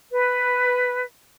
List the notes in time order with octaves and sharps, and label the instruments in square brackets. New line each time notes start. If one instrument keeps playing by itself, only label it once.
[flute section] B4